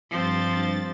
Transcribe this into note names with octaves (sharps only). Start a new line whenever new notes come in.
G2 F3 C4 A6